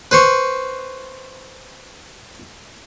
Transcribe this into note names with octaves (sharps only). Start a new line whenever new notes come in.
B4 C5 C#6